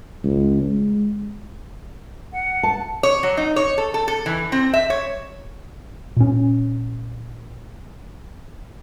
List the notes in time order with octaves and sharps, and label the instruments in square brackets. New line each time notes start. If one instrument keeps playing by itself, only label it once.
[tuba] C#2
G#3
[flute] F#5
[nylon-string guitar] A5
[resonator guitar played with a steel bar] C#5
F#3
D#4
C#5
A4
A4
A4
E3
C4
E5
C#5
[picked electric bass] A#2 C#4